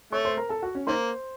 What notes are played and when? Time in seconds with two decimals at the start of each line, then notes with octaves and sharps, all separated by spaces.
0.12 A3 C#5 C#6
0.25 C5 C6
0.37 A#4 A#5
0.49 A4 A5
0.62 F#4 F#5
0.75 C#4 C#5
0.87 D#3 A#3 C5 C6